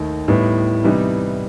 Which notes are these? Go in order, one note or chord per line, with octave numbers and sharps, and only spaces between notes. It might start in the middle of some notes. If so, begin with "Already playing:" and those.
Already playing: D#2 D#3 A3
A2 G3 B3 D#4
C3 E3 G3 B3 D#4